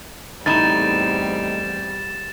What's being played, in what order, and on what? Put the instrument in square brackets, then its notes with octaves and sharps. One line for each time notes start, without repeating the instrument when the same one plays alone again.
[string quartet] E2 G3 C4 [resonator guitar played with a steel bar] A2 D#4 [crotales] A6 E7